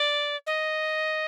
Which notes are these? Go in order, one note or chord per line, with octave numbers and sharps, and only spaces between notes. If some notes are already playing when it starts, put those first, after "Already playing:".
Already playing: D5
D#5